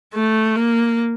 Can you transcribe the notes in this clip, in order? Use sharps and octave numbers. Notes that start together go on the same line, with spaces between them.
A3
A#3